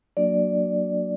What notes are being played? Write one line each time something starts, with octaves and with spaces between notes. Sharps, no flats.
F#3 A#3 D4 F#4 D5